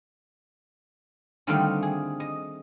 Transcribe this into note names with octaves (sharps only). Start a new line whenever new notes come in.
D3 D#3 G3 A3 C4 F4
G#4
D#5